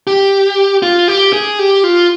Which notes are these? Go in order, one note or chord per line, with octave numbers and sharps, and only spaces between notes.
G4
F4
G4
G#4
G4
F4